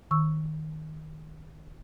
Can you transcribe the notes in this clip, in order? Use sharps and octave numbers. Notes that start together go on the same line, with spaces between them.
D#3 C#6 E6